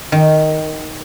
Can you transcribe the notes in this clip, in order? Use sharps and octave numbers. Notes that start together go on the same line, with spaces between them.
D#3